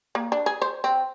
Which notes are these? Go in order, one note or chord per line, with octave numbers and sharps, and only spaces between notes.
A#3
D4
G#4
C5
C4